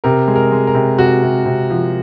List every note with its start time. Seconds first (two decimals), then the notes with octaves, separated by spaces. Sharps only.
0.04 C3 A#4
0.28 G#3
0.36 A#4
0.52 G#3
0.67 A#4
0.75 C3
0.98 C3 F#4
1.23 C3
1.46 C3
1.70 F3